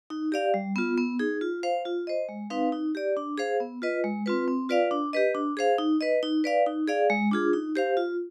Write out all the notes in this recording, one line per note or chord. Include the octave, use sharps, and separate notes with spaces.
D#4
G4 D5 F5
G3
B3 F4
B3
D#4 G#4
F4
C5 F5
F4
C5 D#5
G#3
C4 D#4 B4 F5
D#4
G4 D5
D4
G#4 C5 F5
B3
F4 B4 D#5
G#3
C4 F4 B4
C4
F4 B4 D5 F5
D4
G4 B4 D#5
D4
G#4 C5 F5
D#4
B4 D#5
D#4
B4 D5 F5
D#4
G#4 D5 F5
G#3
D4 F4 G#4
D#4
G4 C5 F5
F4